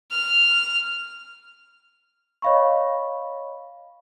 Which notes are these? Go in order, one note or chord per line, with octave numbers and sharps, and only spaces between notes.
F6
C#5 D#5 F5 B5 C#6